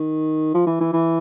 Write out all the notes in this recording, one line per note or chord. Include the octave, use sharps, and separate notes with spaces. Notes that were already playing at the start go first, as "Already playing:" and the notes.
Already playing: D#3
F3
E3
E3
E3